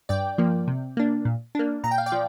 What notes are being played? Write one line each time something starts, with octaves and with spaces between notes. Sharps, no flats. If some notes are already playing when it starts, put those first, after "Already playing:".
G2 D5 G5
F3 A#3
C3
A#3 D4
A#2
A#3 D4
A#2 A#5
G5
F5
D5 G5
F3